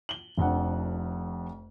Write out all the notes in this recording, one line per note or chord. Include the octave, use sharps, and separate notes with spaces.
F#7 G7
F1 F2 D4 F#5